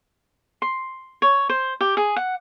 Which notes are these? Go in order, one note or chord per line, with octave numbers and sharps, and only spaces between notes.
C6
C#5
C5
G4
G#4
F#5